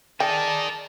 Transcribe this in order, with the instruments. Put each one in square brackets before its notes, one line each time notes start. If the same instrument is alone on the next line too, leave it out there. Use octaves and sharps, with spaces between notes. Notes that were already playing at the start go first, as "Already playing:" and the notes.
[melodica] G#4 D5 [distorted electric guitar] A#4 D#5 [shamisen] G5 [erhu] A5